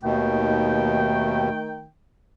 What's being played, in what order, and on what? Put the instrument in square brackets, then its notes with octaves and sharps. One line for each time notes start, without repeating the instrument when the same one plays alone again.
[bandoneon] D#2 B2 [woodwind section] D#3 A3 G5